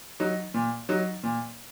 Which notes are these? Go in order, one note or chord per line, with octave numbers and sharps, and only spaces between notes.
F#3 D#4
A#2
F#3 D#4
A#2